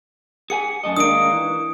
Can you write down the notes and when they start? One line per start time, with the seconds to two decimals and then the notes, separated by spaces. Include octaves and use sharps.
0.50 G#4 F#5 G#5 C#7
0.84 F#2 A3 D#5
0.97 D#3 G#3 A#3 D4 D#6 D7
1.32 E3